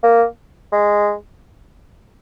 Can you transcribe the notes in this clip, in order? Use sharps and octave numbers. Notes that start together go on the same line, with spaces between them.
A#3
G#3